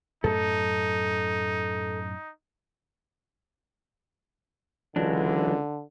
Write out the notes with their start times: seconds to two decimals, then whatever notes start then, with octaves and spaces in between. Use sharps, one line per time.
0.24 F#2 A2 A3 D#4 A4
4.96 C#2 D3 E3 F#3 D4